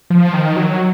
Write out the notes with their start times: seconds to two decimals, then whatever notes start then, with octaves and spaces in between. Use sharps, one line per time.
0.10 F3
0.33 D#3
0.56 F#3